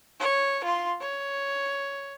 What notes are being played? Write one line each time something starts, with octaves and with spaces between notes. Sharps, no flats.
C#5
F4 C6
C#5